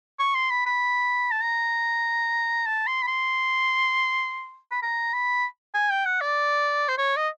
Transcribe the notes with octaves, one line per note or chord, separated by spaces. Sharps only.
C#6
C6
B5
B5
A5
A#5
A5
C6
B5
C6
B5
A#5
B5
G#5
G5
F#5
D5
C5
C#5
D#5